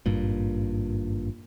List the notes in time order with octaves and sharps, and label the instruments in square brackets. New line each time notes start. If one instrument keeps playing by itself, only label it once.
[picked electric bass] G#1 G2 A#2